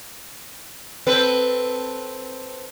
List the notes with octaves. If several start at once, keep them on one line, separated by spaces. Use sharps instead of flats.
C4 A4 B4